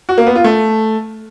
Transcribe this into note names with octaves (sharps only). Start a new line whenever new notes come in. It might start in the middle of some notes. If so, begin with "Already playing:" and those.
F#4
A#3
B3
F4
A3